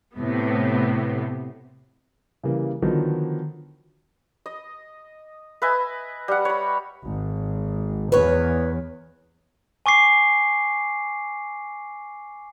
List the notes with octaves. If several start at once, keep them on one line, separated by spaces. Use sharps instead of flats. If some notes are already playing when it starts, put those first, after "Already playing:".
A2 C3 B3
C#3 E3 G3 A#3
D3 D#3 F3 F#3 B3 D#4
D#5
B4 D#5 E5 G#5
G3 F#5
C#5 B5
G#1
E2 B4 C#5
G#5 C#6 D6 C7